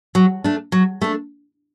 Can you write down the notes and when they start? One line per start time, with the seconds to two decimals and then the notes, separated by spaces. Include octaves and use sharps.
0.15 F#3
0.44 A3 D4
0.72 F#3
1.01 A3 D4